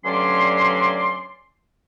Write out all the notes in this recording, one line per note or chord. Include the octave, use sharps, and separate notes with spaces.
D2 G2 F#3 C#4 D5 C6